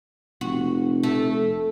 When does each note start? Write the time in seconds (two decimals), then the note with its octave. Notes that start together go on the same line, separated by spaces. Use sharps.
0.41 F1 F#4
1.03 A3